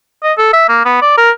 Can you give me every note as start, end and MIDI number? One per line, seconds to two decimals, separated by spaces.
0.23 0.33 75
0.38 0.49 69
0.53 0.67 76
0.69 0.80 58
0.85 1.00 59
1.02 1.16 74
1.18 1.30 70